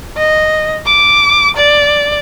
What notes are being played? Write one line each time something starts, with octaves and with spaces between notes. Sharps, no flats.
D#5
D6
D5